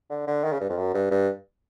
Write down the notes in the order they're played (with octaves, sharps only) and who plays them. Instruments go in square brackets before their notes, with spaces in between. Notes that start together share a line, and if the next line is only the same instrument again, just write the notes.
[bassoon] D3
D3
D#3
C#3
G2
F2
F#2
G2
G2